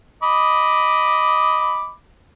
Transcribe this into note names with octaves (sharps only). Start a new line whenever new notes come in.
D#5 B5 D6